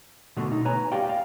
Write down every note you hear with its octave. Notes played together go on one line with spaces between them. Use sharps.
B2 D3 A3
D#4
B4 C#5 G#5 A#5
G4 D5 F5 G5
F5